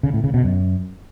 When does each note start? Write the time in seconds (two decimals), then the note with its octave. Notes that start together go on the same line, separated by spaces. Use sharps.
0.03 C#3
0.14 A2
0.24 C#3
0.34 B2
0.44 F#2